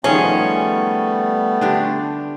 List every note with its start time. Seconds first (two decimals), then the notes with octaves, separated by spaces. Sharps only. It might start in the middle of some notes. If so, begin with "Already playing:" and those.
0.04 D#3 F3 G3 A3 B3 C#4 G#4
1.61 D3 D4 G4